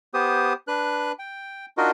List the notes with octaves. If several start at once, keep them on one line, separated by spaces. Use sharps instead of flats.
B3 G4 C5 D#6
D4 B4 F#6
G5
D4 D#4 F4 F#4 A#4 D#5